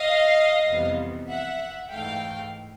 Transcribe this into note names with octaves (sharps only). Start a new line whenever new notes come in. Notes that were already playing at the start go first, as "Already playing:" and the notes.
Already playing: D#5 F5
F2 C3 E3 G3 B3
E5 F#5
G#2 E3 A3 F5 G5